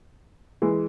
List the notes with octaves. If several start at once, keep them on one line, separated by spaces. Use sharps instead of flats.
E3 G#3